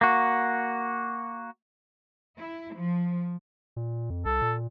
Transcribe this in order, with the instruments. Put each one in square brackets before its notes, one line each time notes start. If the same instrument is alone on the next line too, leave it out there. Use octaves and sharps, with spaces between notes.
[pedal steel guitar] A#3 F#4
[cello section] E4
F3
[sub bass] A#2
F2
[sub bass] C2 [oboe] A4
[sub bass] A#2